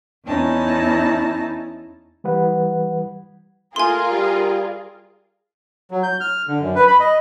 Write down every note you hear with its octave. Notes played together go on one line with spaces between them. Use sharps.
E2 C#4 D#4 E4 A5 A#6
E3 G3 B4 F#5
A3 F4 G#4 A#4 G#5 C6
G3
F#3
G6
F6
D3
F#2
B4
B5
D#5